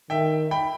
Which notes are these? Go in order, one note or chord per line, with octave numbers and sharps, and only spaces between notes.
D#3 E5 G5
G5 B5